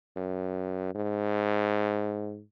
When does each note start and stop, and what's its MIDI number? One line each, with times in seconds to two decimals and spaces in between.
0.17 0.94 42
0.95 2.41 44